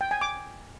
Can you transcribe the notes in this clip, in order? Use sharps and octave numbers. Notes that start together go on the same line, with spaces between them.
G5
G#5
D6